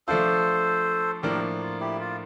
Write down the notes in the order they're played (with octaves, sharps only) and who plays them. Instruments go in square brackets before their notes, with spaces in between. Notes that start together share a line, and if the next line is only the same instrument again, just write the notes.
[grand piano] F3 A3 D4 F4 [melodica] A4 C5
[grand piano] A2 F3 A#3 D4 [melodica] G4 A#4
[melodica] F4
E4 G4
F4